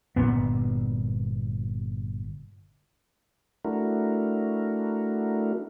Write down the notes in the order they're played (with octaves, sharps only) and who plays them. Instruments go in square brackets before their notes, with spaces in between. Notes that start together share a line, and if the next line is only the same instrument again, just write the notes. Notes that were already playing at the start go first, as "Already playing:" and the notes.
[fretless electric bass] G1 F2 A#2 B3
[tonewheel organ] A3 D4 E4 F#4 A#4